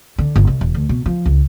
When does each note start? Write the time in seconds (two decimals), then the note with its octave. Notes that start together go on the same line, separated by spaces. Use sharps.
0.18 D3
0.36 G1
0.47 C2
0.61 E1
0.74 D2
0.89 B2
1.06 F3
1.26 C#2